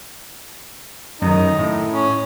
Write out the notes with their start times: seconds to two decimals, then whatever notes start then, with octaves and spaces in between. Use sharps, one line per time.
1.22 F#2 D#3 D#4
1.58 A2
1.93 C#4